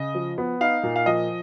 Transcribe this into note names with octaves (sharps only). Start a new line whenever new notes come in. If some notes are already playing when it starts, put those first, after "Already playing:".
Already playing: C#3 D#5
F3
B3
D#4 F5
A#2
F5
F3 D#5